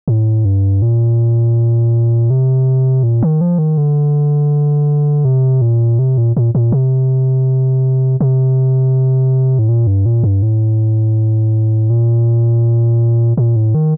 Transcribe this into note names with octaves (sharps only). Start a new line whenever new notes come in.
A2
G2
A#2
C3
A#2
D#3
F3
D#3
D3
C3
A#2
C3
A#2
A#2
A#2
C3
C3
A2
A#2
G2
A#2
G2
A2
A#2
A#2
A2
D#3